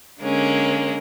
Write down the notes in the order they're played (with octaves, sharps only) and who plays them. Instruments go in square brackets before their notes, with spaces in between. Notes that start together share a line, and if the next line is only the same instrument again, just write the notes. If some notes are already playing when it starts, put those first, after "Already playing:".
[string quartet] D3 G#3 A#3 C#4